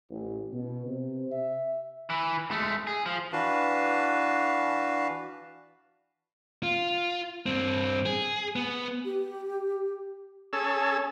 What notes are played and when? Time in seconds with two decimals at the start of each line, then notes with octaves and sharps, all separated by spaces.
0.10 A1
0.53 B2
0.87 C3
1.32 E5
2.10 E3
2.51 G#3 A3
2.87 G#4
3.06 F3
3.33 E3 D4 F#4 B4 F5 A5
6.63 F4
7.46 G2 C4
8.06 G#4
8.56 B3
9.05 G4
10.53 C#4 G#4 A4 E6